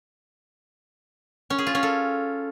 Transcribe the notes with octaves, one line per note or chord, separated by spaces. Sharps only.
C#4
G#4
F4
C#4
A4